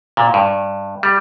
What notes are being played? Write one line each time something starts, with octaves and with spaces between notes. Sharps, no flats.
A#2
G2
G3